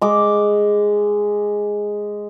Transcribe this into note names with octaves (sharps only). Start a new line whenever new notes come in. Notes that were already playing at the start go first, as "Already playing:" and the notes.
G#3 D6